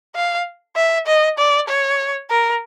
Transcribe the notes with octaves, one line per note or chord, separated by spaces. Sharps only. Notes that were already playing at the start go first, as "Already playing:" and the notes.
F5
E5
D#5
D5
C#5
A#4